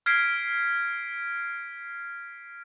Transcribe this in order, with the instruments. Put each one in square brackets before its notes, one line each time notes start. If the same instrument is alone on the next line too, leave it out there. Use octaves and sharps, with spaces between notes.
[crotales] F6 G#6 B6 C7 D7